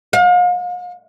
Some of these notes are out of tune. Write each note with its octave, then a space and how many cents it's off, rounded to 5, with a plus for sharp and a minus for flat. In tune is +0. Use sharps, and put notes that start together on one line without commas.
F5 +40